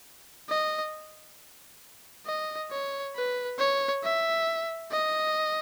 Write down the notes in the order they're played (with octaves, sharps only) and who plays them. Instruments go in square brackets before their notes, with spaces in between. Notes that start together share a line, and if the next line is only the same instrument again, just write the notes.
[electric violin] D#5
D#5
C#5
B4
C#5
E5
D#5